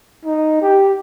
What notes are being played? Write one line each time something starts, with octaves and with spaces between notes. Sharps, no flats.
D#4
G4